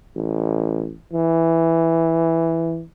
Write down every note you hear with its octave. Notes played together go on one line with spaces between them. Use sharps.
A1
E3